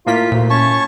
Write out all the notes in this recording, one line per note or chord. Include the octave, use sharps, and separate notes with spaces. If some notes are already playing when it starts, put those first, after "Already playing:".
A2 A#3 F4 B6
D2 A#2
C#4 C#5 A5 C#6